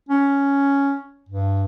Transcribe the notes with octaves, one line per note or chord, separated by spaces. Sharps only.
C#4
G2